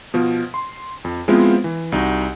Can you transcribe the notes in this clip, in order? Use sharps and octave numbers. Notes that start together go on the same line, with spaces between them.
B2 F3
C6
F2
F3 G#3 B3 C4 E4 F4
E3
C2 D#4 F#4